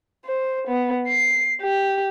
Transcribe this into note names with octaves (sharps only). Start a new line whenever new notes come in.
C5
B3
C7
G4